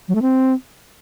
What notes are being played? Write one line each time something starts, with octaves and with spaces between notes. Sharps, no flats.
F#3
A3
C4